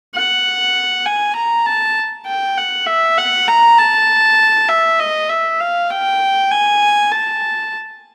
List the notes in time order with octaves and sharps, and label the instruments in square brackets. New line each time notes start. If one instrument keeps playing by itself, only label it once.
[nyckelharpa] F#5
G#5
A#5
A5
G5
F#5
E5
F#5
A#5
A5
E5
D#5
E5
F5
G5
G#5
A5